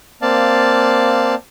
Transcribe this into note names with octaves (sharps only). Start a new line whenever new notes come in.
A#3 C4 D5 F5 A5